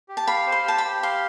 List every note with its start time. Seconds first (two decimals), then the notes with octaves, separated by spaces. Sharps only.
0.09 G4
0.17 A5
0.27 F5 B5
0.47 C5
0.52 C6
0.65 G4 A5
0.78 B5
0.84 G4
1.03 F5 C6